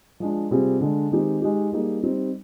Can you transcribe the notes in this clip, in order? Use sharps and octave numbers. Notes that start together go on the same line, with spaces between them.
F3 G#3 D4
C3 G3 C4 F4 G#4
D3 G#3 D4
D#3 G#3 C4 D#4 G4
G#3 D#4 G4
G3 A#3 D#4 G#4
G3 C4 D#4